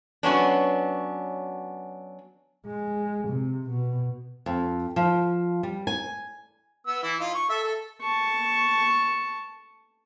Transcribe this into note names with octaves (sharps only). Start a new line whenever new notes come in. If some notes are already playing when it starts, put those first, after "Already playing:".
F#3 B3 C#4 D4
G#3
C3
B2
F2
F3
G3
G#5
B3 E6
E3 E4
D#4 F4
C#6
A4 E5
A4
A5 C#6